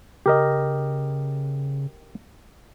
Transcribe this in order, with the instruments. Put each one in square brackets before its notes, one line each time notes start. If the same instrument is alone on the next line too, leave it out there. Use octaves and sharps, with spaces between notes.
[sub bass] C#3 [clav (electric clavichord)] G4 A#4 D#5